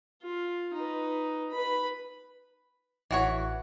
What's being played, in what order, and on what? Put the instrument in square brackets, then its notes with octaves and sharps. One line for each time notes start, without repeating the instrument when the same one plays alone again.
[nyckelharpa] F4
D#4 B4
B4 B5
[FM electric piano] A1 F#5 [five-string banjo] E3 F#4 C#5